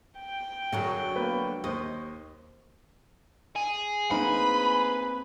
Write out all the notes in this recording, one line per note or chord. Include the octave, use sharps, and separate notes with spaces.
G5
F#2 D3 F#3 F#4 G#4
A#3 B3 B4
D#2 C5 D#5 C#6
G#4
A#3 C4 D#4 B4 B5